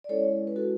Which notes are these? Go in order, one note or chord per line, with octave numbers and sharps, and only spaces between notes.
D5
G#3 C#4 E4 A4 C#5
B4
F#4 A4